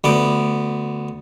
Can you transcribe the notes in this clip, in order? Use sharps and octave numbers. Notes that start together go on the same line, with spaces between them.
D2 B3 D6